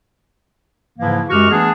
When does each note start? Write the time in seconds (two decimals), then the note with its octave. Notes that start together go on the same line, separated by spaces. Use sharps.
0.99 G#2 C#3 E3 F3 A#3 E4
1.30 F#2 G#3 F#4 G4 C#6 F6
1.51 E3 A3 B3 D4 G#4